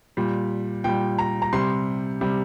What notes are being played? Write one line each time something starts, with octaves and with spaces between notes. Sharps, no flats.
A#2 G3
A#2 G3 G5
A#5
A#5
C3 G3 C6
C3 G3